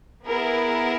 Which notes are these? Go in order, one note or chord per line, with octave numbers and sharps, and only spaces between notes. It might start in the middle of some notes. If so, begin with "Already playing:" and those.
B3 E4 G#4 A#4